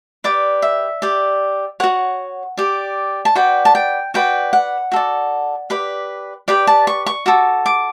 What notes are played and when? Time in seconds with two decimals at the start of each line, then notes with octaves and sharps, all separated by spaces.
0.24 G4 B4 D5 D6
0.62 E5
1.02 G4 D5
1.80 F#4 C#5 F#5
2.57 G4 D5
3.25 A5
3.35 F#4 B4 D5 G5
3.65 A5
3.75 G5
4.14 F#4 B4 D5 G5
4.53 F#5
4.92 F#4 A4 D5
5.70 G4 B4 D5
6.48 G4 B4 D5 G5
6.67 A5
6.87 C#6
7.06 C#6
7.26 F#4 A4 D6
7.66 D6